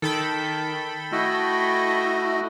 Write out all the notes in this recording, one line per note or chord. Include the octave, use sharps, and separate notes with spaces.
D#3 A4 G5 B5
A3 E4 F#4 D#5